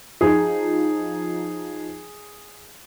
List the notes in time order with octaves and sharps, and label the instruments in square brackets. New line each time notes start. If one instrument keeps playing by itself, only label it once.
[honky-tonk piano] F3 D#4 [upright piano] G#4